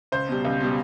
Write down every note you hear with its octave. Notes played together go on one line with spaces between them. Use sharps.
C#2 C5
B2 G3
C#2
B2 G3